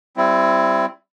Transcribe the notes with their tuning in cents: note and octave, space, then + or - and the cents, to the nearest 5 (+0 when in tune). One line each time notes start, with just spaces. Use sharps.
G3 +0 C4 +0 E4 +20